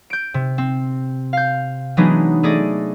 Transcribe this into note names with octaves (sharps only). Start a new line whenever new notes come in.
G6 D7
C3
C4
F5 G6
E3 F#3 G#3 B3 D4 D#4
A3 G#4 D5 D#5